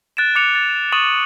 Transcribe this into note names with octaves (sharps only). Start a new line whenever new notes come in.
F#6 A6 D7 E7
D6 F#6 C#7 F7
A6
C#6 D#6 A6 D#7 E7 F#7